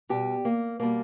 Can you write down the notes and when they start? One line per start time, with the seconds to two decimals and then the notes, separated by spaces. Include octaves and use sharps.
0.09 B2 G3 G4
0.45 A#3
0.80 B2 G3 A#3